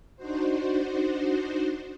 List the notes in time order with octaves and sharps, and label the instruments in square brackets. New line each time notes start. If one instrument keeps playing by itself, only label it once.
[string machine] D4 D#4 F#4 C5